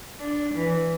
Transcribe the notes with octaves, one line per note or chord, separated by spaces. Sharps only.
D4
E3